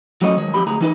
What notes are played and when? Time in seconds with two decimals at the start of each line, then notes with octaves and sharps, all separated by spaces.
0.22 F3 F#3 A3 C#4 C#5 D#5
0.37 D#3 G#3 C#5
0.54 F2 E3 G4 B5
0.67 D2 G#4 A#5
0.81 E3 D#4 B4